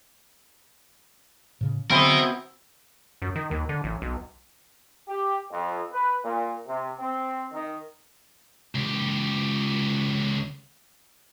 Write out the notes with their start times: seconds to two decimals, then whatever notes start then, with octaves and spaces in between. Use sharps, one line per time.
1.61 A2 C#3
1.90 B2 D3 F#3 C4 E4 A#4 D#5
3.22 F#2
3.36 D#3
3.51 D#2
3.69 D3
3.84 A1
4.02 B1
5.09 G4
5.51 F2
5.93 B4
6.24 A#2
6.67 C3
7.00 C4
7.53 D#3
8.75 C#2 G4